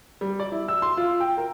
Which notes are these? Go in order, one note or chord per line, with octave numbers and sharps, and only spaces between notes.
G3
D5
E4
E6
C6
F4
G5
A#4